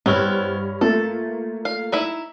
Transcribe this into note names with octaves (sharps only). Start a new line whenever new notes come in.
G2 B3 C4 E4 C#5 F6
A3 A#3 F4 A4
F5
D#4 E4 E5